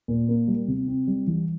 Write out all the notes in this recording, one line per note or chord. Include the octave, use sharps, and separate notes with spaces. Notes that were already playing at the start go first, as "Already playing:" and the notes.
A#2
A#3
G3
C3
C4
G3
E3